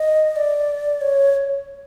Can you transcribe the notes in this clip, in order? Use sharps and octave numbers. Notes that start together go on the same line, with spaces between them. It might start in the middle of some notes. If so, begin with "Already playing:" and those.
Already playing: D#5
D5
C#5